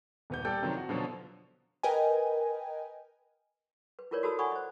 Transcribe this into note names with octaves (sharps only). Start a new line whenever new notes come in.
D#1 B3 G6
G3 A4 D5 G5 G6
C3 D#3 F3 F#3
F#4
B2 D3 F3 F#3 B3
A#4 B4 D#5 G5 G#5
B4
E4 F4 A#4 B4 C#5 D5
F#4 A4 A5 B5 D#6 E6
D5 F#5 G#5 B5 C#6 D#6
C5 D#5